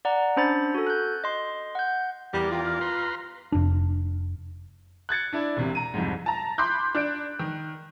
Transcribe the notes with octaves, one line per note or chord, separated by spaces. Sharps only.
D5 F#5 A#5
C#4 D4 C5 B5 A6
F#4 A4
F#6 G6
D#5 C6
F#5 G6
E2 G3 A#4 D5
F4 G5
F6
B4 A#5 C6
F1 D4
F#6 G#6 A6 C#7
D4 E4 D5
E1 C3
A#5 D#7
C2 F2 G#2
A5 A#5
B5 C6 D6 F#6 G6
D4 F#6 D7
D#3